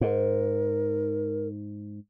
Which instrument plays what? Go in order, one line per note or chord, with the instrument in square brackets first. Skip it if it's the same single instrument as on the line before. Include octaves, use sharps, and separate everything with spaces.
[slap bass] G#2 [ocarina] A#4